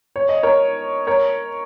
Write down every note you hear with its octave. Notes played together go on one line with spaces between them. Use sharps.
C#5
D#5
A#4 C#5
A#4 C#5